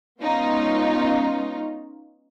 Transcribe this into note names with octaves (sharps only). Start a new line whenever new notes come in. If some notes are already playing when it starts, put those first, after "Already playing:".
G#3 B3 C#4 D#4 F4